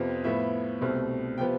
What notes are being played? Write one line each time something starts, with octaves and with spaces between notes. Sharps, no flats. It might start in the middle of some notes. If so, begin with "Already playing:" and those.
Already playing: F2 C3 F3 B3
A2 F3 B3 E5
C2 B2 A3 C4
C3 F3 B3 G5